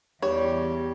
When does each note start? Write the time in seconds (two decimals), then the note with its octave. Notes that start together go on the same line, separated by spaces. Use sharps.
0.22 E2 G3 G4 C#5